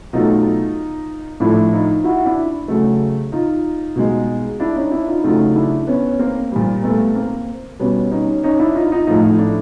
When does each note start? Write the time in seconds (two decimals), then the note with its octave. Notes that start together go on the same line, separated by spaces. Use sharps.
0.13 B2 F#3 A3 D#4 F4
1.40 A2 F3 A3 D4 E4
1.73 D#4 F4
2.04 E4 F#4
2.25 D4 E4
2.68 C#3 F#3 A3
3.32 D#4 F4
3.96 B2 G#3
4.60 D4 E4
4.75 C#4 D#4
4.91 D4 E4
5.08 D#4 F4
5.24 C#3 F#3 A3 D#4 F4
5.55 D4 E4
5.87 B3 C#4
6.19 A#3 C4
6.52 A#2 G3
6.83 A3 B3
7.15 A#3 C4
7.79 B2 G3 B3 C#4
8.11 C#4 D#4
8.43 C#4 D#4
8.59 D4 E4
8.75 D#4 F4
8.91 D#4 F4
9.07 A2 F3 A3 D#4 F4
9.39 D4 E4